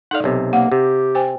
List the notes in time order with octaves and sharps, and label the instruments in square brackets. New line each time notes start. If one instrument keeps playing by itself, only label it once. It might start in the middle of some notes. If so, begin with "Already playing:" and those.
[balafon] D#4 A4 D5 [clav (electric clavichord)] F5 F#5
[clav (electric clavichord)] B1 C3
[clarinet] A#3 [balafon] F#5
[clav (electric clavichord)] C3 [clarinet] G4
[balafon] C5 G5 G#5